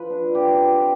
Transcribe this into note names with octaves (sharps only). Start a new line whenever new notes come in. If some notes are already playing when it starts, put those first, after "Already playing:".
Already playing: F3 B4
D4
D3 G4
C4